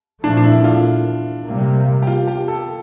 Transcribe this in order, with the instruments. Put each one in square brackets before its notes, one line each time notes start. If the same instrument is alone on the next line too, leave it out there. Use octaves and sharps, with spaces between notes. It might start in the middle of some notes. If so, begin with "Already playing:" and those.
[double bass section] A#2 F3 A3 [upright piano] D4
[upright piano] D4
E4
F4
[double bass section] C3 G3 A#3
[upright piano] G4
F4
G4
A4